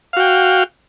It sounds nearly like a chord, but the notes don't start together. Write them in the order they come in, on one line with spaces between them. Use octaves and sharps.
F5 F#4 G5